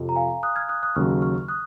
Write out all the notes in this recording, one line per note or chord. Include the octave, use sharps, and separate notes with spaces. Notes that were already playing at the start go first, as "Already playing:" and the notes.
Already playing: F2 C3 F3
A#5
F5 G#5
D#6 F#6
F6 G#6
D#6 F#6
D#6 F#6
D#2 C#3 F#3 C#6 F6
C#6 F6
D#6 F#6